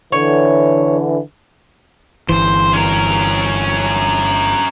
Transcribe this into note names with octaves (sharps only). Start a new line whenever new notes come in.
D3 E3 C#5
G1 E3 C5
C#4 A#4